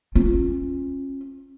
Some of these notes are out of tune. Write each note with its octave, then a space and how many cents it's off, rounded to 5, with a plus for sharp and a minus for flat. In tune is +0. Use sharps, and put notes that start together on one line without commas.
C#4 -30 F4 +5